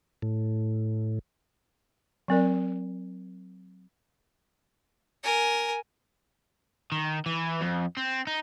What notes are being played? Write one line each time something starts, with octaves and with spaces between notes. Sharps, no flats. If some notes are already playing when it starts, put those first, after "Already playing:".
A2
F#3 C4 A#4 D5
A#4 G#5
D#3
E3
F2
C4
D#4